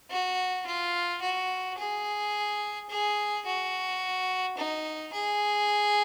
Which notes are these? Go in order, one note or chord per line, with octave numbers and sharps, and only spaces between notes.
F#4
F4
F#4
G#4
G#4
F#4
D#4
G#4